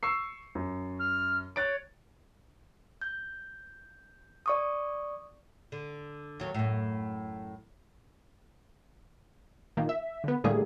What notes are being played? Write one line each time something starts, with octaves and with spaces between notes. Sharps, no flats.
C#6 E6 C7
F#2
F6
C#5 F#6 A6 D7
G6
D5 C#6 D#6
D3
D#2 F#3
F#2 A2
A#2 D#3 A#3
E5
D3 B3
A2 D3 G3 A3 A#3 G#4